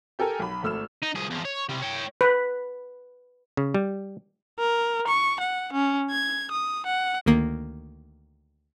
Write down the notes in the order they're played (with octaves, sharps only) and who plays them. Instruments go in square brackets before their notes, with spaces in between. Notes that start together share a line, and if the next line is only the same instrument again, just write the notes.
[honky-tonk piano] G4 A4 A#4 G#5 A#5
B1 B5
G#1 A3 E6 F6 E7
[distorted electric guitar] D#4
C2 G#4
E2 F3
C#5
C3 G3
C#5 G5
[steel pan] B4
[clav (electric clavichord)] C#3
G3
[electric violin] A#4
C#6
F#5
C#4
G#6
D#6
F#5
[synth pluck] D2 D#3 A#3